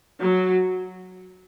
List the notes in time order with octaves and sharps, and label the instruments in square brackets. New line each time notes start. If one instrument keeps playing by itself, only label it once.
[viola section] F#3